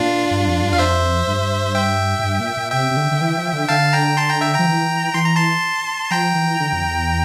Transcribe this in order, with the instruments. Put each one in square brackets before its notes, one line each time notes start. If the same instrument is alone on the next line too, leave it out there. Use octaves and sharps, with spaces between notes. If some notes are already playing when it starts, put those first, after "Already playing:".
Already playing: [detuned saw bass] A#2 [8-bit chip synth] D4 F4
[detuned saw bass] G2
F2
G2
[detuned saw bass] E2 [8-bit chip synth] F5
[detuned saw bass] F2 [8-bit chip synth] C5 E5
[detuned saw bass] G2
[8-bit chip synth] E5 G5
[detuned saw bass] A2
G2
A#2
A#2
[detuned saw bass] C3 [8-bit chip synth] E5 G5
[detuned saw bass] C3
D3
D3
E3
F3
D3
[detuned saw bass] D3 [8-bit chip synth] F5 A5
[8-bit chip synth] G5 A#5
A5 C6
G5 A#5
E5 G5
[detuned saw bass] F3 [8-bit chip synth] G5 A#5
[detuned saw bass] E3
[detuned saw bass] E3 [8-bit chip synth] C6
[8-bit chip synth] A#5
A5 C6
[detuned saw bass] F3 [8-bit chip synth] G5 A#5
[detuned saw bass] E3
D3
F2
E2